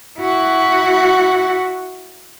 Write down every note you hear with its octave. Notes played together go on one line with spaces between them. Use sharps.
E4 F#4